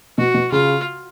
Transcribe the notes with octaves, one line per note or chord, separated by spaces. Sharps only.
B2 F#4
B2
C#3 F4